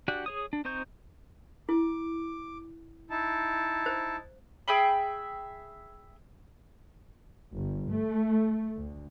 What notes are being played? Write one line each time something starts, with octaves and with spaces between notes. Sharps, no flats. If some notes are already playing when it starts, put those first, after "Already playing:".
D4 F#4 G4 D5 F#5
G#4 C#5 D#6
D4
C4 D#4 C5 C#6 G6
E4 D6
D#4 E4 A5
C5
G#4 E5 G5 B5
G1
A3
D2